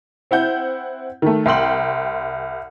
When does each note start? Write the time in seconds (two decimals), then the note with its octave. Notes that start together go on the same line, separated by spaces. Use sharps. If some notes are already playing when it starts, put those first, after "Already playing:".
0.31 C4 E4 F#5 G6
1.22 D#3 A3
1.46 C2 G5 C6 F#7